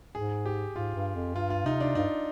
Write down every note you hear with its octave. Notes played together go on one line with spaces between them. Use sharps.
G#2 G#4
G4
G#2 F4
G2
F2
G2 F4
F4
C3 D#4
D4
G2 D#4